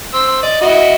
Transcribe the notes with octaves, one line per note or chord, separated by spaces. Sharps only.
C5 E6
D5 D#5
E4 F#4 D#5